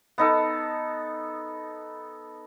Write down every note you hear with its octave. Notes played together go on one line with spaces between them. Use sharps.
B3 D#4 A4